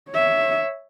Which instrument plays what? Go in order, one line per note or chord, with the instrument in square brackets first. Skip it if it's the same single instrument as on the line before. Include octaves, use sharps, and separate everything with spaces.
[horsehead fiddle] C#5 E5